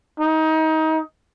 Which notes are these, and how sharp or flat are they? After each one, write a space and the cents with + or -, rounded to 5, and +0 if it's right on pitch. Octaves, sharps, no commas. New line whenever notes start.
D#4 +25